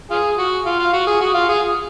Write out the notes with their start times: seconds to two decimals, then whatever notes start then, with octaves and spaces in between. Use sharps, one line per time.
0.11 F4 G#4
0.38 F#4
0.66 F4
0.79 F4
0.93 F#4
1.07 G#4
1.21 F#4
1.34 F4
1.48 G#4